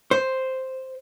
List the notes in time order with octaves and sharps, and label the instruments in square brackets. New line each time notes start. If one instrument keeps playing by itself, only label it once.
[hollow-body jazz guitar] C5